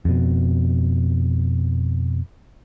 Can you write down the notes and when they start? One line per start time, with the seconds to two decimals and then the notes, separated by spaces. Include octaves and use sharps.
0.05 F2 B2